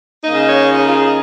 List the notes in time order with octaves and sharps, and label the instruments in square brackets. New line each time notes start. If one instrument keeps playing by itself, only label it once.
[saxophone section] C#3 A#3 D#4 D#5
C#5
F4
G#4
F4
G#4